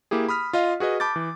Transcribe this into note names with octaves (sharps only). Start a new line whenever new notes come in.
A#3 E4 G4 G#4
B5 D#6 F6 B6
F4 D#5 F5
F#4 G#4 B4 D#5
A5 B5 D6 G6 A6
E3